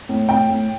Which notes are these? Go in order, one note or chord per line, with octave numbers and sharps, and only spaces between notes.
A2
A2 G5
A2